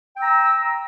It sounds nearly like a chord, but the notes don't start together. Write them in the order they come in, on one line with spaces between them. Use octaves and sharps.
G5 E6 A#5